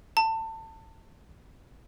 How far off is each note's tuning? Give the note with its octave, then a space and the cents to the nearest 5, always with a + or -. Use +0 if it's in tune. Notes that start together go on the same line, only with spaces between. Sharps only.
A5 +25